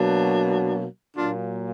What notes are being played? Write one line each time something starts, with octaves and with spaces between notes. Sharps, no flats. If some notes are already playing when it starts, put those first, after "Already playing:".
Already playing: B2 F#3 A#3 D4
A#2 F#3 A#3 D4 F4